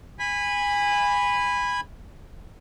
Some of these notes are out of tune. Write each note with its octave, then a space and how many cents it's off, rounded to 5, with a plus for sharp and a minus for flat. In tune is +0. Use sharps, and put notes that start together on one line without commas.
G#5 -20 B5 +0